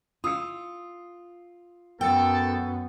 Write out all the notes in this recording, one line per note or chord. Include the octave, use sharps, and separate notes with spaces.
F4 D#6 E6 C#7
F#2 B3 A4 G5